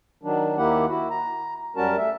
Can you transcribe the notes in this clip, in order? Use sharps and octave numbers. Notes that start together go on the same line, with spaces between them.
D#3 F#3 D4
D#2 D#3 A#3 E4 G4 F#5
E4 F#4
A#5
F#2 G3 C#4 F#4 A#4 A5
A3 E5